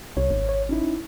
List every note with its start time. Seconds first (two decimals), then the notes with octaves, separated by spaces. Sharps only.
0.17 C2 C#5
0.30 G#1
0.49 C#5
0.69 C#4 D#4 E4